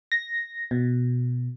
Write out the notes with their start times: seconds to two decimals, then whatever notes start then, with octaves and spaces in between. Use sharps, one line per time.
0.12 A#6
0.71 B2